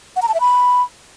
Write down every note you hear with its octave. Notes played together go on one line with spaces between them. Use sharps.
F#5
A#5
A5
E5
B5